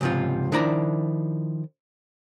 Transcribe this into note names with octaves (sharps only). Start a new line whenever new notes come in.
C#2 G#2 C3 F3 F4
D#3 F3 D4 E4 D5 A#5